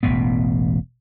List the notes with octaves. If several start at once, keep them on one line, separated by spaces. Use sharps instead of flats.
E1 A1 B2 B3